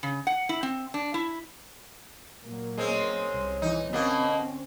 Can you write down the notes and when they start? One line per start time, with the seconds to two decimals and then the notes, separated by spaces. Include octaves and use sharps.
0.03 C#3
0.27 F#5
0.49 E4
0.63 C4
0.94 D4
1.14 E4
2.44 A#2 F#3 A#3
2.77 G#3 C4 C#4
3.30 C2
3.62 E3 D#4
3.93 B2 D3 A#3 C4 C#4